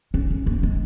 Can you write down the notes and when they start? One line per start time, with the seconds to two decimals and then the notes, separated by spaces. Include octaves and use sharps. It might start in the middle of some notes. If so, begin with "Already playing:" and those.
0.14 C#4
0.30 C#4
0.46 A#3
0.63 G#3